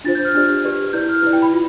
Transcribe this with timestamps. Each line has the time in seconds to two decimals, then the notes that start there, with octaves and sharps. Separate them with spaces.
0.04 D4 F4 C5 A6
0.15 G6
0.25 F6
0.35 D4 G4 D5
0.65 G4 B4 D5
0.93 E4 B4 D5 G6
1.09 F6
1.23 E4 B4 D5
1.33 G5
1.42 B5
1.53 F4